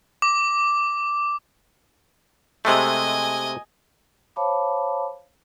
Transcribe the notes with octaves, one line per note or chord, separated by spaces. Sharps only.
D6
C3 G#3 A3 D#5 G#5
C5 C#5 F5 A5 B5 D6